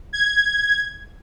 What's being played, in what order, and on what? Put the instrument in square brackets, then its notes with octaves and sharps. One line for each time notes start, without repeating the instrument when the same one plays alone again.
[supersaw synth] G#6